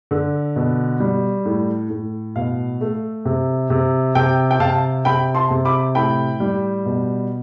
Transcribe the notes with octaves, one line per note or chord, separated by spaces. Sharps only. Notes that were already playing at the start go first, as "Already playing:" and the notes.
D3
B2
G3
A2
A2
B2 F5
A3
C3
C3
C3 G5
G5
C3 F5 A5
C3 G5 B5
A5 C6
C3
B5 D6
A2 G5 B5
G3
B2